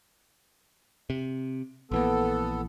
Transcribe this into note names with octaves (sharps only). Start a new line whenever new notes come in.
C3
A#1 E3 A#3 B3 A4